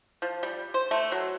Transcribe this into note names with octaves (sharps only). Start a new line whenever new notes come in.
F3
G3
C5
A3
F#3